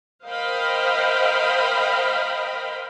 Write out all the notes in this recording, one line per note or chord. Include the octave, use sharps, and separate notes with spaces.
A#4 C5 D#5 F5 G5 B5